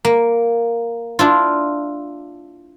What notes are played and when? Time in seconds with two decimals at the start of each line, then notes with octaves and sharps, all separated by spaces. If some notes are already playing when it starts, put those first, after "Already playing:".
0.05 A#3
1.19 D4 E4 F4